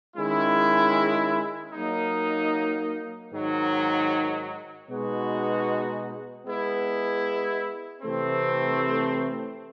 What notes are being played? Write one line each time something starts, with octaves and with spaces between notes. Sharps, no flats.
D#3 G#3 C#4 E4
F#3 A#3 D#4
G#2 D#3 F#3
B2 G#3 B3 D#4 F#4
G#3 B3 E4
C3 E3 A3 C4